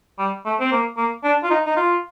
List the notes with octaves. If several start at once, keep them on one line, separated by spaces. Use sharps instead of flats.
G3
A3
C4
A#3
A#3
D4
F4
D#4
D#4
F4